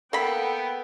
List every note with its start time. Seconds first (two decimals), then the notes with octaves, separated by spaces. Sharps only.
0.13 A#3 B3 A4 G5 B5